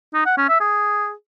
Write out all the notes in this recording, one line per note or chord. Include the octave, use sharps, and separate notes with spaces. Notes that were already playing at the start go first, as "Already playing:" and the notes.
D#4
F#5
C#4
E5
G#4